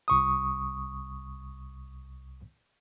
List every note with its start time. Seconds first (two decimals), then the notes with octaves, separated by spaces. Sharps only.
0.08 C2 C#6 D#6